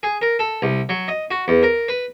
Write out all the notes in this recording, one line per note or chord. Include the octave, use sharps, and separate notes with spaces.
G#4
A#4
A4
C2
F#3
D#5
F#4
E2
A#4
B4